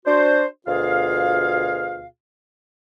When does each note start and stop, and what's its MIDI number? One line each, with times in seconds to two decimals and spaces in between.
0.06 0.45 62
0.06 0.45 66
0.06 0.45 72
0.66 2.05 38
0.66 2.05 47
0.66 2.05 65
0.66 2.05 68
0.66 2.05 77